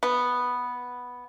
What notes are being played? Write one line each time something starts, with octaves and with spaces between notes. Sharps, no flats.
B3